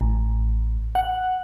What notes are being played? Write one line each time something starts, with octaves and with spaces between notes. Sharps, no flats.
A1
F#5